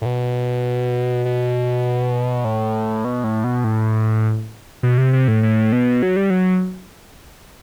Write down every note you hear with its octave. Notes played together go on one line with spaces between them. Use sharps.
A2
B2
B2
A2
B2
A2
B2
A2
B2
C3
C3
A2
A2
B2
F#3
G3
F#3